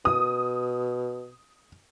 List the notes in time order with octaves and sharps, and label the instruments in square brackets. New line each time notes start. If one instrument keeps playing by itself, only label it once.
[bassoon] B2 [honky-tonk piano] D#6